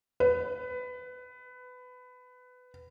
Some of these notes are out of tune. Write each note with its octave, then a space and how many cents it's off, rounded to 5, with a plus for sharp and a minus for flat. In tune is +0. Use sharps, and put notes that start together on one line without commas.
B4 +20